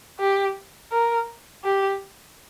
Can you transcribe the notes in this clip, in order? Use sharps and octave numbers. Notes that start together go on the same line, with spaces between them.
G4
A#4
G4